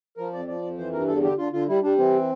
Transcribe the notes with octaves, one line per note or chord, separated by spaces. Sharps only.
F3 A#4
F2 D5
F3 D5
F2
E3 C5
G2 A#4
E2 A4
D3 G4
D3 F4
D3 F4
G3 E4
G3 D4
E3 C4